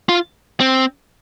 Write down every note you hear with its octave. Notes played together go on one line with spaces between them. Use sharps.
F4
C4